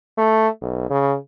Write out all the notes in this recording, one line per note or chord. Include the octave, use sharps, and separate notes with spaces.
A3
B1
C#3